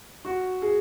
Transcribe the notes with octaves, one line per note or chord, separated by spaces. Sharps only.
F#4
G#4